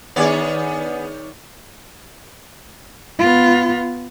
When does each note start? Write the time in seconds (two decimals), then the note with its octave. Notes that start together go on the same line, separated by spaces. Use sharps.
0.16 D#3 B3 D4 G#4 C#5 D5
3.19 B3 F4